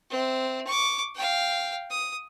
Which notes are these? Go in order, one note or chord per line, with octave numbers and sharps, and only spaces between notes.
C4 E5
C#6 D6
F5 G5
D#6